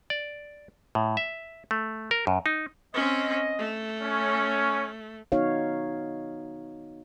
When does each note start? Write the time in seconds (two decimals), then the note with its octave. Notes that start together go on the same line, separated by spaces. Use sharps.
0.10 D5
0.95 A2
1.17 E5
1.71 A3
2.11 A#4
2.27 F#2
2.46 D#4
2.94 C4 C#4 D#5
3.58 A3
4.02 C#4
5.32 B3 D#4 F#4 C#5 F5